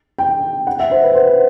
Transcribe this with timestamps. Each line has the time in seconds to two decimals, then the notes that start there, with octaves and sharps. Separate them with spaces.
0.19 G5
0.67 F#5
0.80 E5
0.91 C5
1.03 B4
1.15 C5
1.26 B4